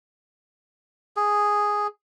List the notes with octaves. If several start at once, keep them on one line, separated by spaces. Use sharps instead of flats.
G#4